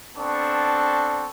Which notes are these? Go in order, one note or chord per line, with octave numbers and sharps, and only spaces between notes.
B3 C4 D4 A4 A5 C#6